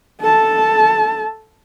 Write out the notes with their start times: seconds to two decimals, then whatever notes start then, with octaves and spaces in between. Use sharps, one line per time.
0.21 A4 A5